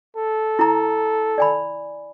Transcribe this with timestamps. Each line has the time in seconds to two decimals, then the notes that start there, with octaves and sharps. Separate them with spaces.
0.17 A4
0.59 E4 A#5
1.38 D5 G#5 B5